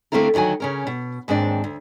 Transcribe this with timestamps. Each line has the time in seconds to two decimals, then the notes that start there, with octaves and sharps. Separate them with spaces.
0.12 D3 A3 A#3 C4 E4 A#4
0.34 D2 D#3 F#3 F#4 G#5
0.60 C#3 C#4 A#4
0.87 B2
1.28 D#2 G#2 C4 D4 D5
1.64 D2